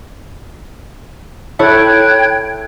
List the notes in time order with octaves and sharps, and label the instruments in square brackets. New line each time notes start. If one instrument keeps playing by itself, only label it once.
[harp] E4 A4 C#5 [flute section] G5 F#6 G#6